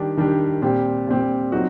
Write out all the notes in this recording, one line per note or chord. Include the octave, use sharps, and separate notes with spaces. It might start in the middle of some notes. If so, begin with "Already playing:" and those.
Already playing: D#3 G3 D4 G4
D#3 G3 D4 G4
A#2 G3 C4 G4
A#2 G3 C4 G4
F#3 C4 D#4 F#4